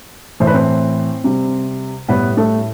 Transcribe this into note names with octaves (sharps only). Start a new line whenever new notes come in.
A2 E3 A3 C5
B4
C4 C5
C3 G3
A2 G3 B3 B4
A3 A4